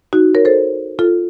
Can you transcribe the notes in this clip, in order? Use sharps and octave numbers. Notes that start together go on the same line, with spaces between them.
D#4 F#4
A#4 C#5
A4 C5
F4 A4